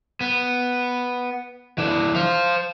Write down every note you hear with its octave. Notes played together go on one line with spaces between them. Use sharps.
B3
E3 D4
C5 F5